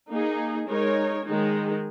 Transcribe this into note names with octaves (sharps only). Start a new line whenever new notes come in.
A#3 D#4 G#4
G#3 D#4 A#4 C#5
D#3 G#3 D#4